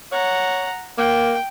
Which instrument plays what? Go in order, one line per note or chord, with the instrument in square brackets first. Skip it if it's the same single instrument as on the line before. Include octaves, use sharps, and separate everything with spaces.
[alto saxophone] C#5 [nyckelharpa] F#5 A#5
[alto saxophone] A#3 [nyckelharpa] G5